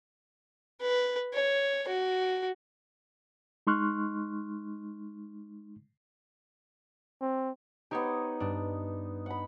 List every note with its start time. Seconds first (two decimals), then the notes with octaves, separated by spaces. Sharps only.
0.81 B4
1.34 C#5
1.88 F#4
3.67 G#3 D#4 C6 C#6 F6 F#6
7.21 C4
7.91 B3 D#4 G4 C5 C#5
8.40 G2 D4
9.26 F#5 B5